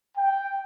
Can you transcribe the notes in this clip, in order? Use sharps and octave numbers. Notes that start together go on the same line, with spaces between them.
G5